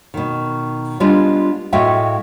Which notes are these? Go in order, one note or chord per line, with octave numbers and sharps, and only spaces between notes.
B2 D#3
G3 G#3 B3 D4 F4
A2 G#3 F#4 E5 F5 G5